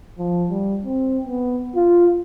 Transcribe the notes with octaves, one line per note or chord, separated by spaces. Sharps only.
F3
G3
C4
B3
F4